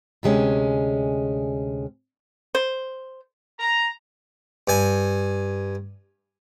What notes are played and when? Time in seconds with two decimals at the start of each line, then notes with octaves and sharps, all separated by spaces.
0.23 D2 C3 G#3 C#4
2.55 C5
3.60 A#5
4.68 G2 G#5